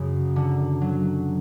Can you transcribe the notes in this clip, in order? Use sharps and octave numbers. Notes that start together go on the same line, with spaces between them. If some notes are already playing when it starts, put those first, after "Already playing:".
Already playing: F#2 C#3 G#4
D3
F#3